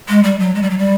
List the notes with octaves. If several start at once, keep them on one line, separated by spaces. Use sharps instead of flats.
G#3
G3
F#3
G#3
G3
F#3
G3